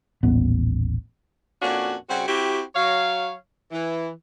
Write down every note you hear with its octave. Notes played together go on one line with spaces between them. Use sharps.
D#1 A1 B3
F2 A#2 C#4 D4 F4 F#4
C#3 G3 C4 F#4
C4 E4 F#4 G4
F#3 C#5 F5
E3